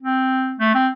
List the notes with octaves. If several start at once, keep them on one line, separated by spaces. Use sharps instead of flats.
C4
A3
C4